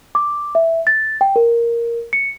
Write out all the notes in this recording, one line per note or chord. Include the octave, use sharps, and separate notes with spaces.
D6
E5
A6
G5
A#4
C#7